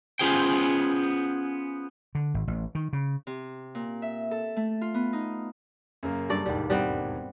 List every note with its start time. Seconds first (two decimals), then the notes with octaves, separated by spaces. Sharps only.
0.19 B3 C#4 F4 G#4 C5 G5
2.15 D3
2.34 G#1
2.47 A1
2.75 D#3
2.93 C#3
3.27 C3
3.75 A#2
4.02 E5
4.31 A4
4.56 A3
4.81 F4
4.94 B3
5.13 D#4
6.03 F#2 C#3 A#3
6.30 G2 A4 D5
6.46 E1 D#2 G#2 G3
6.70 G3 B3 C4